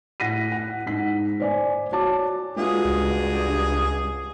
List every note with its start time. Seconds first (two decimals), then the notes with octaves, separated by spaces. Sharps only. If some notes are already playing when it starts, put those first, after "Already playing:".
0.20 A2 F#5 A#6 B6 D#7
0.52 F#5
0.86 G#2 B6
1.40 C5 D5 G#5
1.92 F#4 C#5 A5 D6
2.56 G2 G#3 F4 F#4 G#4
2.85 C#2